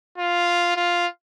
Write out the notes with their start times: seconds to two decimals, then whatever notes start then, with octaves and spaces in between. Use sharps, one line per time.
0.18 F4
0.76 F4